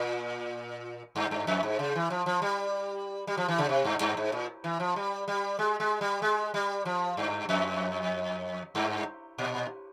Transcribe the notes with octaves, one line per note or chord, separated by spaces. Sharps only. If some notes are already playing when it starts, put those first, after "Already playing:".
Already playing: A#2
G2
G2
F2
G#2
C#3
E3
F3
F3
G3
G3
F3
E3
C#3
C3
G2
G2
G#2
A#2
E3
F3
G3
G3
G#3
G#3
G3
G#3
G3
F3
G2
F2
G2
A#2